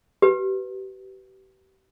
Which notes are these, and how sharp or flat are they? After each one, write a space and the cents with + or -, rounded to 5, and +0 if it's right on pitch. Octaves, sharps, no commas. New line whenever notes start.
G4 -35 B4 +0